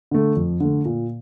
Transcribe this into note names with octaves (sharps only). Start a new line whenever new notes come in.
D3 A3
F2
D3 A3
A#2